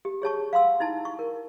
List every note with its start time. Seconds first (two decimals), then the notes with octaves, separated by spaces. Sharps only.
0.05 G4
0.22 G#4 C#5 A5 C#6
0.53 F5 F#5 C6 E6
0.80 D#4 E4 A5
1.05 C#6
1.19 A#4